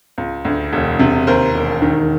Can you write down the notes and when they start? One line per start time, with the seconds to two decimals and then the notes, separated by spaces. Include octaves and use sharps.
0.18 C#2
0.45 D2
0.73 E1
0.99 C3
1.27 D#2 A#4 C5
1.55 E1
1.82 D#3